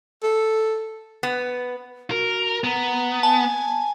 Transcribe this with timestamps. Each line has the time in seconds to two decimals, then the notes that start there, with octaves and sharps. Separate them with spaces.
0.23 A4
1.23 B3
2.11 F#4 A#4
2.64 B3 A#5
3.23 G#5 A5